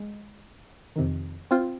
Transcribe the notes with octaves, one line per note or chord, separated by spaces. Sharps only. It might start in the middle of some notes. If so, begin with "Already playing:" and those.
Already playing: G#3
F2 C3 D#3
C4 F4